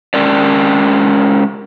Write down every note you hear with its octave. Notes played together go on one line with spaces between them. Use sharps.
G#3 C#4 A#4 D5